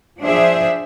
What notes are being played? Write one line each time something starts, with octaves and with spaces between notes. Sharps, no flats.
F3 D4 G#4 C5 E5